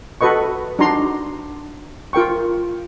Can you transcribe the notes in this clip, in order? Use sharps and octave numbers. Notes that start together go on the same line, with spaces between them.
F#4 A4 B4 D#5 C#6
D4 D#4 F#4 A#5 C6
F4 A#4 G5 C#6